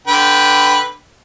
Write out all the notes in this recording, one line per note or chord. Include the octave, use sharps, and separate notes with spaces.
D3 B4 G5